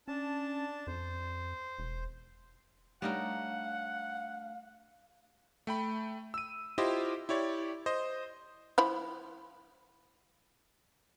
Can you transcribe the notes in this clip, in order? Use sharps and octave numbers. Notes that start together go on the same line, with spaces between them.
C#4 D4 A5
F2 C5
E1
G3 A3 D4 D#4 A#4 C#5 F5 F#5
A3 G5 B5
E6 D#7
E4 F4 G4 C5 D#5
E4 G4 C#5 D5
C5 D#5
F3 E4 B5